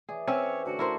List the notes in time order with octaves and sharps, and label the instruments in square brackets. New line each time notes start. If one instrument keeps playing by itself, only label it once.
[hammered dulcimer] E3 D5 [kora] G#4
[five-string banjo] C4 [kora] C#4 E5 [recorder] C#5
[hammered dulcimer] D3 A3 A4 [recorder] F#4
[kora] E4 A#4 C5